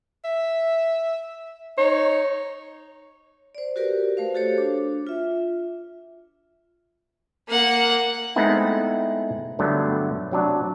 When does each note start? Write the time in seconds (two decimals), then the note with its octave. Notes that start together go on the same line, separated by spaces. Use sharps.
0.24 E5
1.78 D#4 C#5
3.55 C5 D5
3.76 F#4 G4 A#4 B4 D5
4.17 A3 C5 F5
4.34 F#4 G4 A4 C5 C#5
4.58 D4
5.07 F4 E5
7.49 A#3 F#5
8.36 G#3 A3 B3 C4 D#4 E4
9.59 G2 D3 F#3 A3 B3
10.32 C3 F#3 D4